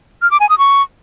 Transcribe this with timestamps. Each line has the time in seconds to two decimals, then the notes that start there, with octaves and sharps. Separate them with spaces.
0.22 F6
0.31 D6
0.40 G#5
0.49 D#6
0.58 C#6